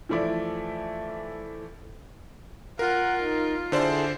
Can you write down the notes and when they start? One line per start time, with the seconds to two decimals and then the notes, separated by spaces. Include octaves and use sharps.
0.09 E3 F3 A3 E4 D5
2.79 F4 A#4 F#5
3.20 D#4
3.72 D3 E4 G#4 A4 C5 D5